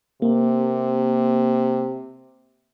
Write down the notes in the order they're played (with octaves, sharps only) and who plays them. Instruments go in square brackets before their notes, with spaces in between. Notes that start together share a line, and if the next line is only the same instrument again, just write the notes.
[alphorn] C3 [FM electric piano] A#3